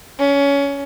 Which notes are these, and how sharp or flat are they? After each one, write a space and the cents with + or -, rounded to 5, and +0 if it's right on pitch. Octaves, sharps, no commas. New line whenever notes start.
C#4 +20